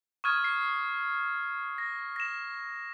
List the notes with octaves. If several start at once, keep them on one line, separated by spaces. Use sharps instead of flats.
C#6 D#6 F6 G#6 D#7
C7
A#6
A#6 E7